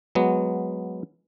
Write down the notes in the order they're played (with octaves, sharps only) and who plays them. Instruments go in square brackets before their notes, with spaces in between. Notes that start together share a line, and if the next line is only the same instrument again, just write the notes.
[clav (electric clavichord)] F#3 G#3 B3